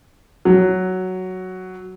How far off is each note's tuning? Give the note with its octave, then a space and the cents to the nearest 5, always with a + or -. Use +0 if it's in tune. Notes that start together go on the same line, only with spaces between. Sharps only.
F#3 +5